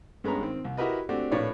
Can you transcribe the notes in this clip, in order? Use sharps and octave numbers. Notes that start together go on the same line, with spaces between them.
G2 G#3 B3 C#4 A#5
D#3 C4
C2
E4 F#4 G4 A#4 B4 D#5
A3 C4 D4 F#4 G4
A#1 A2 B4 C#5 D5